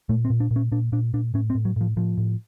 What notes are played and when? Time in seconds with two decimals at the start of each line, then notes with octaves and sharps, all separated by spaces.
0.09 A#2 A3
0.25 C4
0.30 A#2
0.40 D4
0.51 A#2
0.56 C#4
0.72 A#2 D4
0.92 A#2 D4
1.13 A#2 D4
1.34 A2 C#4
1.50 C4
1.55 A2
1.65 F#3
1.76 A2 F3
1.96 A2 F3
2.17 A2